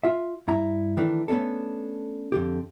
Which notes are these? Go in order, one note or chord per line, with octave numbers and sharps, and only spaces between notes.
F4 E5
G2 E4 A#5
D#3 E3 A3 D4
A3 B3 C#4 D4 A4
F2 D3 G4